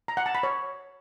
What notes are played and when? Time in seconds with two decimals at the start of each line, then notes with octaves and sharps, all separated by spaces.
0.08 A#5
0.17 F#5
0.26 A5
0.35 B5
0.43 C#5